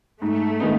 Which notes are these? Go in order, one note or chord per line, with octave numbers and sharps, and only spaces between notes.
G#2 A3
D#3 G#3 B3 D#4